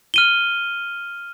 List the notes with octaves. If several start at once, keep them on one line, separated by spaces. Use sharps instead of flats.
F6 D#7 G7